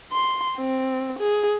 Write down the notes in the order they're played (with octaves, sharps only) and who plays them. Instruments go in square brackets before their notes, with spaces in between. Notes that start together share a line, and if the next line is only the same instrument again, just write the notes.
[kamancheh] C6
C4
G#4